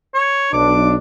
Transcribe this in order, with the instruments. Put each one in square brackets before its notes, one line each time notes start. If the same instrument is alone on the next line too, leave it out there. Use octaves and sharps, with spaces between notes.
[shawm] C#5
[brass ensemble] B1 D4 [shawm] D6